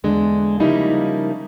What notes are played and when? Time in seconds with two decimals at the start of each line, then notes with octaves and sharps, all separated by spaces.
0.04 E2 D3 G#3 D4
0.60 C#3 F3 G3 A#3 D#4 E4